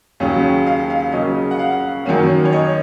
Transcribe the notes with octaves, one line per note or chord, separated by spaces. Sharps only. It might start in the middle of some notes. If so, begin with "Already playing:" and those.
D#2 C#3 F#3 C#4
F5
F5
C#3 F#3 A#3 C#4 D#5
F#5
F5
F#2 D#3 F#3 A#3 C#4
C#5
D#5